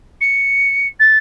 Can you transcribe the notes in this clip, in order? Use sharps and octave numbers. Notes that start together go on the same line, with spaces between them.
C#7
A6